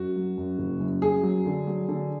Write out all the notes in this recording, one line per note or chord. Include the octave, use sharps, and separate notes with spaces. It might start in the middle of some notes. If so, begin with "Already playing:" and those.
Already playing: F#2 F#4
F#3
F#2
F#1
F#2
F#2 G#4
F#3
D3
F#3
D3